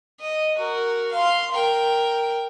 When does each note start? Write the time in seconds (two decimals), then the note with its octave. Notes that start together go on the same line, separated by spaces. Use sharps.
0.20 D#5
0.56 F#4 A#4
1.11 F5 C6
1.51 A#4 G5